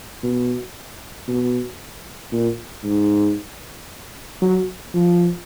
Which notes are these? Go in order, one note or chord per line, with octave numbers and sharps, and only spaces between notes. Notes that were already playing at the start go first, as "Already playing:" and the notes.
B2
B2
A#2
G#2
F#3
F3